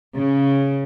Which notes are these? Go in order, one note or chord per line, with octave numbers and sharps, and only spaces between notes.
C#3